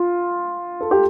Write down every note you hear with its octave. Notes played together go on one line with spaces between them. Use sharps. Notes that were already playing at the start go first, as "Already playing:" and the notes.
Already playing: F4
A4
G4